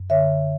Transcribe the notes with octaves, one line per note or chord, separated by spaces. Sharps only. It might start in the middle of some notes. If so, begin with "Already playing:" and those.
Already playing: F#2
D3 C#5 E5